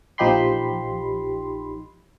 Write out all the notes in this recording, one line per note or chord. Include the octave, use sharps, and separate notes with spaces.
A#1 F3 D#4 G4 B5 C6